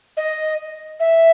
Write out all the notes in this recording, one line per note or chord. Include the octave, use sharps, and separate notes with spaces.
D#5
E5